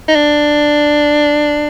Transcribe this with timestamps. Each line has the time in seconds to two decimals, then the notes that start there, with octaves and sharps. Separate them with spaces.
0.08 D#4
0.15 D4